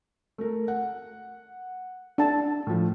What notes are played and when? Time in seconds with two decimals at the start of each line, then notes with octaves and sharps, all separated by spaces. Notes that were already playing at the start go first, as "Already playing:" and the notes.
0.38 A3 A#4
0.68 F#5
2.18 D4 A5
2.67 A2 F3